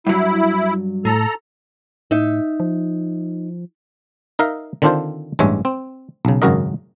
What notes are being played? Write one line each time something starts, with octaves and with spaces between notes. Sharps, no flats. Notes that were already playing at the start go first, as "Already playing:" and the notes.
G2 F#3 E4
A2 A4 A#5
A2 D#4 E5
F3
D#4 A#4 E5 F5
D3 D#3 C4 D4 F4 C5
A1 G2 G#3 C#5 E5
C4
B1 C#3
G#1 F#2 C#3 F#4 A#4 D#5